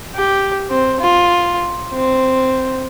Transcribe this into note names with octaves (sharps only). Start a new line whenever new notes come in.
G4
C4
F4
C4